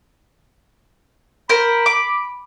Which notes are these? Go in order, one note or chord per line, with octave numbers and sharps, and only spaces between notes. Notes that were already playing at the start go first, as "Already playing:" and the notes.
A#4 C5 B5
D6